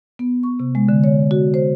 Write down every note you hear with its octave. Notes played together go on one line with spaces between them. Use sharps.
B3
C#6
C3
G#3
D3
C#5
F#4
C5